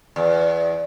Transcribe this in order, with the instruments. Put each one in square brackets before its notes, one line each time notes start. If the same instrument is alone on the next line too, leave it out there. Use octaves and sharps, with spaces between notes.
[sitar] E2